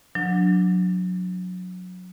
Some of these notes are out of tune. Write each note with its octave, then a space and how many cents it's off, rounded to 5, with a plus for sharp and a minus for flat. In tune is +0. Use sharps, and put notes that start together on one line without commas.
F#3 -25 D4 +0